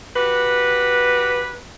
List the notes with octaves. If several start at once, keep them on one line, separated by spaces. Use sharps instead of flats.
F#4 G4 B4